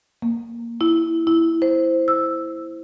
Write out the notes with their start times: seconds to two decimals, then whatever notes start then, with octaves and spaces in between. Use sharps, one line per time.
0.22 A#3
0.81 E4
1.27 E4
1.62 C5
2.08 E6